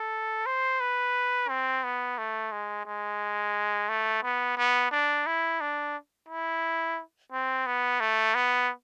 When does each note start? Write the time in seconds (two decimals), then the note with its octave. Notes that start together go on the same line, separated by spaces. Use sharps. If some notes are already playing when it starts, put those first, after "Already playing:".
Already playing: A4
0.46 C5
0.80 B4
1.49 C4
1.84 B3
2.18 A3
2.52 G#3
2.86 G#3
3.89 A3
4.23 B3
4.57 B3
4.91 D4
5.26 E4
5.61 D4
6.28 E4
7.32 C4
7.66 B3
8.00 A3
8.35 B3